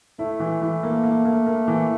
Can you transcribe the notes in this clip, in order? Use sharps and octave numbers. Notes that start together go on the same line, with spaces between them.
A3 E4
E3
E3
A#3
A#3
A#3
A#3
E3